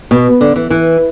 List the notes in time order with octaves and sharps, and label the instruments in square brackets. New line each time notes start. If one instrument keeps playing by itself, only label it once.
[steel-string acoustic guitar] B2
D3
E3
E3